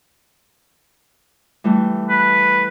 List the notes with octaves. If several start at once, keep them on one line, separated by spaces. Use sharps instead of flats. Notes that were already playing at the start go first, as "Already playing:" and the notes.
E3 G3 A3
B4